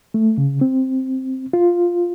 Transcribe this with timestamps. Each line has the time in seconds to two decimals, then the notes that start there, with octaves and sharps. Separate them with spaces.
0.14 A3
0.38 C#3
0.61 C4
1.53 F4